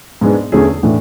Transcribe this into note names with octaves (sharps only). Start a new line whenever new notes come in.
G#2 G#3 B3 D4
E2 D3 A3 C#4 G#4
A2 E3 A3 D4